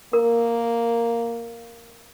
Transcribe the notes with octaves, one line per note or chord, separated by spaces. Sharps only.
A#3 A#4